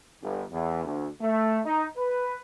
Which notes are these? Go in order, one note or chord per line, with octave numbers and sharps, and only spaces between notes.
G1
E2
D2
A3
D#4
B4